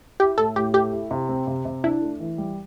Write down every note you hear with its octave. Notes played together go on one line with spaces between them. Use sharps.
E4 G4
A2 A4
A2 G4
A3 G4
E4
C3
C4
C3
C3
D4 E4
A3
E3
G3